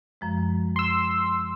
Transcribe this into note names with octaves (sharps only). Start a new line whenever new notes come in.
F#2 F3 G#3
C6 E6